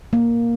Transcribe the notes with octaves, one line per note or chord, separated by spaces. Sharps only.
A#3